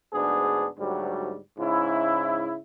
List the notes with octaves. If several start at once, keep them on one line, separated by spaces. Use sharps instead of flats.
D2 G#2 B3 D4 G#4
D2 G#2 F#3 G3
G#2 C#3 E4